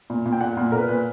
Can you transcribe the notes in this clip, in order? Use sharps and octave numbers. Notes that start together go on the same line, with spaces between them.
A#2
A#2
G5
A#2 F#5
F#5
A#2
A#2 A#4
B4
A#2 B4